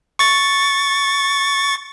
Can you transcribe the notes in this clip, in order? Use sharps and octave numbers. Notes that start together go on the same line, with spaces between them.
C#6 A6